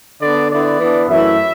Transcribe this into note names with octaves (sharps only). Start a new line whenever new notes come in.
D3 B3 D4 D5
D3 B3 E4 D5
E3 B3 D4
F#2 E3 A3 E4 E5